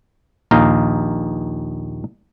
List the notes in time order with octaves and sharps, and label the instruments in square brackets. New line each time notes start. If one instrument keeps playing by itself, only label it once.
[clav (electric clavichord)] A#1 D#2 D#4 F5 A#5